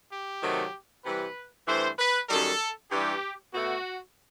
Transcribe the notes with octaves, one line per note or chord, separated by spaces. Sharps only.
G4
C3 D#3 F#3 A3
C3 E3 G3 B4
G2 E3 A3 C5
B4
F#2 D#3 G3 A4
G2 E3 G3 G4
B2 A3 F#4